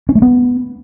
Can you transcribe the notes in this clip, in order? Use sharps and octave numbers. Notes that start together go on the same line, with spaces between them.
C#4
A3
B3